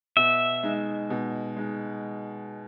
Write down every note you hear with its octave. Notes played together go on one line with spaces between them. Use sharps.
B2 E5
G#3 D#4
B2
G#3 D#4